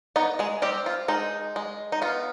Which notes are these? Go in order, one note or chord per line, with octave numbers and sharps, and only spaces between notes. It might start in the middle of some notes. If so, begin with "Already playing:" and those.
B3 D#4 B4
G#3 G#4
G3 C4 G4
F4
G#3 D#4
G#3
D#4
B3 F4